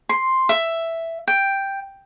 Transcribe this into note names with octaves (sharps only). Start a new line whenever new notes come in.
C6
E5
G5